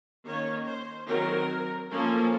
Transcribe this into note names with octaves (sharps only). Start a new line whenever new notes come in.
D#3 A#3 C#4 C#5
C5
D#3 F#3 C4 A#4
F3 A#3 C#4 A4